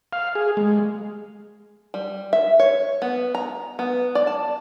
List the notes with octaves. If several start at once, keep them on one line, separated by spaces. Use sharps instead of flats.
F5
G#4
G#3
G3
E5
C#5
B3
A#5
B3
D5
A5